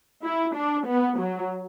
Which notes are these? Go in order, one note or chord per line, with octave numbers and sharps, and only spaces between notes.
E4
D4
B3
F#3